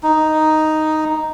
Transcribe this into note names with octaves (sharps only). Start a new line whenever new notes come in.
D#4